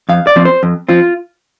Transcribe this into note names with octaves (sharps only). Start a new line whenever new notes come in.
F2 F5
D5
F3 C4
C5
F2
F3 C4 F4